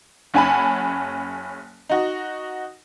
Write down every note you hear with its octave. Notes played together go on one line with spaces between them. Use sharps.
F#1 C#4 F#5 G#5 A5 B5
D#4 F#4